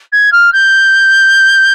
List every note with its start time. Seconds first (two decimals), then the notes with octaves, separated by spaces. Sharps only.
0.12 G#6
0.32 F6
0.52 G6